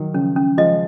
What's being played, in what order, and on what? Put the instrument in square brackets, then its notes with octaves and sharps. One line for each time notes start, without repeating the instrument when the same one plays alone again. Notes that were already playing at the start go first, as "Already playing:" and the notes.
Already playing: [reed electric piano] D#3 F#3
[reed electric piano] C#3 F3 [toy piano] C#4
[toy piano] C#4
[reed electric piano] F3 G#3 [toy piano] D#5